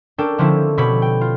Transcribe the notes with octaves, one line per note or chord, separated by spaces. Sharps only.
C#4 D4 A4 A#4 G5
D3 F3 C4 C#4 E4
B2 G4 A4 C#5 B5 B6
G5
F4